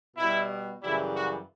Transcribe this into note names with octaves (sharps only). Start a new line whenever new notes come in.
B2 G3 E4
F#2 C#3 E3 G3 E4
F#4